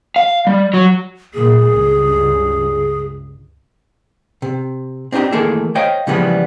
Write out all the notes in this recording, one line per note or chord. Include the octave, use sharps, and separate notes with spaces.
F5
G3
F#3
A#2 G#3 G#4
C#2 G2
C3
C4 D4 D#4 F4 G4
D#3 E3 A3 A#3 G#4 A4
C5 C#5 D#5 F5 G5
C#3 E3 F3 G3 G#3 B3